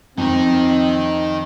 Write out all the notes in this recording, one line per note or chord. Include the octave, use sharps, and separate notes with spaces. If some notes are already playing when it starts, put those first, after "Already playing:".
F2 D#3 C4 D#4